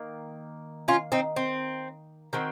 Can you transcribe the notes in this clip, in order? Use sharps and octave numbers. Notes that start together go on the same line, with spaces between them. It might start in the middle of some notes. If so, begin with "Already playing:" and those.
Already playing: D#3 A#3
C#4 F4
C4 D#4
C4
D#3 F#3 C4